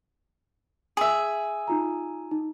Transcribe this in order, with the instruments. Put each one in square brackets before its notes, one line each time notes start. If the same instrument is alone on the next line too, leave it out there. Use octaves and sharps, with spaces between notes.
[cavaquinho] G#4 E5
[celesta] D#4 F4 A#5
D#4